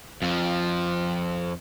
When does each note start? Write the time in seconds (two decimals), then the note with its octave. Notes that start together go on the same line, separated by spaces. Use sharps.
0.22 F2 F3